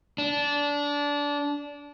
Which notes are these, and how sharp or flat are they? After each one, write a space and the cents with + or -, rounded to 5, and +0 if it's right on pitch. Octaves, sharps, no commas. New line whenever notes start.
D4 -20